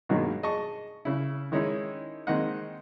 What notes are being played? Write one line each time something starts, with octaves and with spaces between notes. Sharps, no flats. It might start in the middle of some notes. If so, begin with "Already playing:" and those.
G2 B2 D#3 F#3 G#3 A#3
G#4 D#5 A5 C#6
C#3 E4
D#3 G#3 C#4 D#4 E4
D#3 G#3 A#3 C4 D#5 F#5